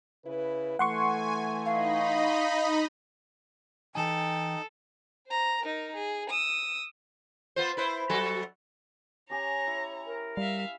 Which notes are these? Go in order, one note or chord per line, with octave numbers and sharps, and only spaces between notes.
C#3 E4 B4
E3 A3 F#5 G#5 C6 C#6
D#4 D#5 F5 B5
E3 D#4 A4 G5 G#5
C5 A#5
D#4 A#4
G#4
D#6 E6
B3 F4 C5
E4 B4 C5
F#3 F#4 A4
C#4 G4 C#5 G#5 A#5 A#6
E4
A#4
G3 E5 F5